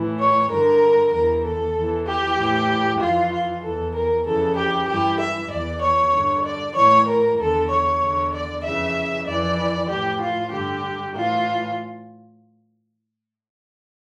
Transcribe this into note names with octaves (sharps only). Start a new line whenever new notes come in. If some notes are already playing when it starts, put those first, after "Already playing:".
Already playing: A2 E3
C#5
G2 D3 A#4
E2 E3 A#4
A4
E2 E3
G4
A2 E3
F2 E3 F4
F4
E2 E3 A4
A#4
F2 C#3 E3 A4
G4
G2 E3 G4
E5
E2 E3 D5
C#5
G2 D3
D5
A2 E3 C#5
A#4
E2 D3 A4
C#5
E2 D3
D5
F2 C#3 E3 E5
F2 E3 D5
A2 E3 G4
F4
G2 D3 G4
A2 E3 F4